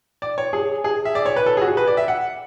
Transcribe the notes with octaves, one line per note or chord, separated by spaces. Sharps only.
D5
C#5
G#4
G#4
E5
D5
C#5
B4
A4
G#4
F#4
G#4
B4
D5
E5
F#5